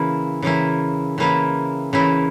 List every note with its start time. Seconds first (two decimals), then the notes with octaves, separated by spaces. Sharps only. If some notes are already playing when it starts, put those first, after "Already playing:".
Already playing: C#3 E3 A#3 E4
0.42 C#3 E3 A#3 E4
1.18 C#3 E3 A#3 E4
1.93 C#3 E3 A#3 E4